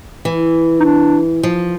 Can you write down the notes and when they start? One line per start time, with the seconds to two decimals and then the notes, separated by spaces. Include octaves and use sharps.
0.25 E3
0.80 D#4
0.84 D4
1.43 F3